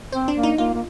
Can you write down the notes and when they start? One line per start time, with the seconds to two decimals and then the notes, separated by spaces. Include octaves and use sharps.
0.12 C4 C5
0.28 D4
0.36 A#3
0.43 D#4
0.58 A#3 F4
0.74 A#3